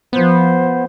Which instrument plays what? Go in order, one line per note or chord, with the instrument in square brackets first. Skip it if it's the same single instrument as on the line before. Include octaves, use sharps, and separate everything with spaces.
[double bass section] F3 [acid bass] B3 [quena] C5